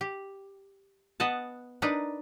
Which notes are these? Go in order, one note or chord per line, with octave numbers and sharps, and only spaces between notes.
G4
B3 D#5 F#5 A5
D4 D#4 A#4 B4 D5